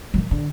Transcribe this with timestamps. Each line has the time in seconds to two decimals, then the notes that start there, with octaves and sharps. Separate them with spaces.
0.14 F3
0.18 D#3
0.31 D3